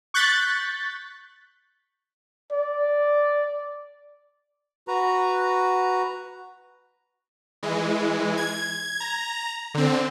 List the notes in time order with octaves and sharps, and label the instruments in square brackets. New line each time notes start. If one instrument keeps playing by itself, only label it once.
[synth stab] C#6 F#6 G6 A6 B6
[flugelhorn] D5
[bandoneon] F#4 B4 A#5
[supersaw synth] E3 G#3
G#6
A#5
D3 C4